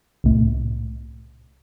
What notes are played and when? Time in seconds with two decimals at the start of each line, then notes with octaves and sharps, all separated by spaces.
0.24 C2 A2